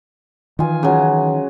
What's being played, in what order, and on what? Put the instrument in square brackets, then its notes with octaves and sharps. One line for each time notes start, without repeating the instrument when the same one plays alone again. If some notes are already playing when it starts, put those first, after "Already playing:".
[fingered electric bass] D#3 E3 [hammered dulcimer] F4 G#5
[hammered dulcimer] C#3 F#3